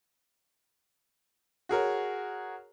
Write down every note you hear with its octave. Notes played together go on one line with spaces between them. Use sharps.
F#4 G#4 A#4 C#5